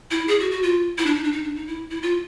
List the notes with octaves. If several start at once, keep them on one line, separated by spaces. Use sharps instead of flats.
E4
G#4
F#4
F#4
F4
E4
D4
D#4
D4
D#4
D4
D#4
E4
E4
F4